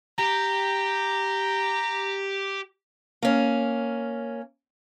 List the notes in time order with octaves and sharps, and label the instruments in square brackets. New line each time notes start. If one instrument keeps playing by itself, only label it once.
[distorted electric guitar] G4 [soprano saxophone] A#5
[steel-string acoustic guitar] A#3 C#4